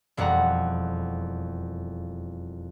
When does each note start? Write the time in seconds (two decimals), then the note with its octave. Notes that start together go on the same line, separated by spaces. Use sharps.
0.17 E1 F2 G3 F#5 A#5